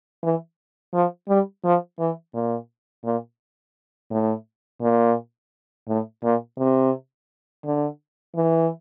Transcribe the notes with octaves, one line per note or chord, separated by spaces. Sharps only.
E3
F3
G3
F3
E3
A#2
A#2
A2
A#2
A2
A#2
C3
D3
E3